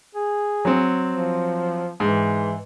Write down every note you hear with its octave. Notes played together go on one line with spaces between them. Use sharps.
G#4
F#3 C4
F3
G#2 E3